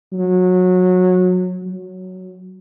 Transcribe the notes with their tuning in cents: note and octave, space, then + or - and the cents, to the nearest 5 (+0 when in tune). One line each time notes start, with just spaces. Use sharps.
F#3 -20
F#3 +0